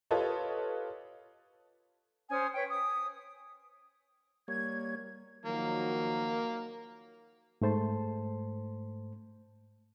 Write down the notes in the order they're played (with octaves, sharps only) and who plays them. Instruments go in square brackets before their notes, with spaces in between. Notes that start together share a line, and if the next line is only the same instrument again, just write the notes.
[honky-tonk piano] F4 G4 A4 B4 C#5 D#5
[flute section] C#4 C5 G#5 D#6
B4 C#5 G5
D#6
[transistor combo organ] G3 A#3 C#5 [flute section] G#6
[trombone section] D#3 F3 F#3 [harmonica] A#3
[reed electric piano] G#2 A3 C5 A5 C6